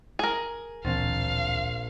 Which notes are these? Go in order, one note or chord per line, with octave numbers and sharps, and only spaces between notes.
G#4 A#4
D1 A#1 E3 C4 F5 A6